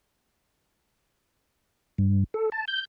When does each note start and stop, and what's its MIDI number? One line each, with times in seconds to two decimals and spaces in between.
1.98 2.24 43
2.34 2.49 69
2.52 2.65 81
2.68 2.85 91